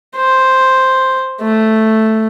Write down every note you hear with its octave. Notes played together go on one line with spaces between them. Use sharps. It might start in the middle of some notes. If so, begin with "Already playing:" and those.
C5
A3